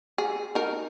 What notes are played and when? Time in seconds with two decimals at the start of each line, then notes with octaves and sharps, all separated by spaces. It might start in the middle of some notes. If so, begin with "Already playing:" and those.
0.18 G#4
0.55 D#4 A#4